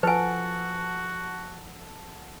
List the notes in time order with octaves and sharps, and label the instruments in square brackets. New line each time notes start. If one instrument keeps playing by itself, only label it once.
[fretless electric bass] F3 [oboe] F#4 [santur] A4 F#5 [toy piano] B4 G#5